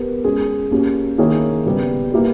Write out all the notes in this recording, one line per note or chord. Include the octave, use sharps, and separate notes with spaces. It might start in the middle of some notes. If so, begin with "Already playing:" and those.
Already playing: B3 G4 A#4
G#3 C#4 G#4
A#3 C#4 G4
D#3 A#3 E4 G#4 C#5
C#3 G3 B3
A#3 E4 G4 B4